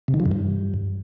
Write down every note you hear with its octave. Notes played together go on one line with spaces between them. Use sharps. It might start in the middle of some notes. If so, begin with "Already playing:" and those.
C3
D#3
F3
F#2
G2